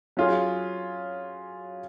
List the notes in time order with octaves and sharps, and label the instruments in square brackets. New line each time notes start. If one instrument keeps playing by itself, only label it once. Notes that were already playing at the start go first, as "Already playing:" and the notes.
[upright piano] F#3 C#4 F4 G#4